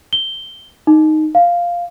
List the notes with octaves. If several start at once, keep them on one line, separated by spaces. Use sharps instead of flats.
G7
D#4
F5